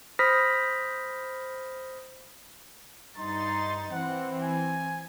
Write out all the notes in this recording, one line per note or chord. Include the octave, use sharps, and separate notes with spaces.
C5 B5 D#6 F6 A#6 B6
G2 D#4 C6 A6
E3 C4 F#5
G#5